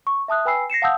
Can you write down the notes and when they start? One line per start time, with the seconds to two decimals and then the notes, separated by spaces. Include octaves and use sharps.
0.07 C#6
0.28 E5 A5 D#6 F#6
0.45 B4 G5 G#5 B5 E6 C7
0.70 A#6 C7 C#7 E7
0.82 F5 F#5 A5 D#6 E6 G6